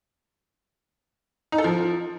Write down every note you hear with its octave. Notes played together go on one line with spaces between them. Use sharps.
D#4
A4
F3